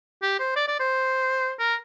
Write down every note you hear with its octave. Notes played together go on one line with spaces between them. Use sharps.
G4
C5
D5
D5
C5
A#4